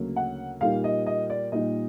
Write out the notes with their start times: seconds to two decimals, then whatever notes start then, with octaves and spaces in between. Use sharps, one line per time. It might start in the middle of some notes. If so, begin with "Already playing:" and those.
Already playing: D2 C#3 F#3 A#3
0.16 F#5
0.61 A#2 G3 A#3 D#4 F5
0.84 D#5
1.06 D#5
1.30 D5
1.52 A#2 G3 A#3 D#4 D#5